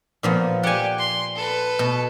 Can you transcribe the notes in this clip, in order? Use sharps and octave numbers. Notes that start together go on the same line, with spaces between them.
A#2 F3 B3
G4 D5 F#5 G#5
C6
A4 B4
B2